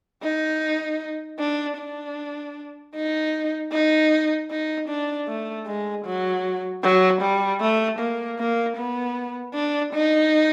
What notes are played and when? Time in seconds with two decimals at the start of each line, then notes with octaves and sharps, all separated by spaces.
0.23 D#4
1.39 D4
1.78 D4
2.95 D#4
3.72 D#4
4.50 D#4
4.89 D4
5.28 A3
5.67 G#3
6.05 F#3
6.83 F#3
7.22 G3
7.61 A3
7.99 A#3
8.39 A#3
8.77 B3
9.55 D4
9.93 D#4